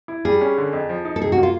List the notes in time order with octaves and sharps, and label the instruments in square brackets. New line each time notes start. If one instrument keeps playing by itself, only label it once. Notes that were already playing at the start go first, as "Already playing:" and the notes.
[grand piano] E4
[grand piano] G3 [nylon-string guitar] G#4
[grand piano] C#4
D3
F2
F3
D#4
[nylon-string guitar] A4
[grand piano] C3 [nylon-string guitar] G#4
[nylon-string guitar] F#4
[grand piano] A#3
[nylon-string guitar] F4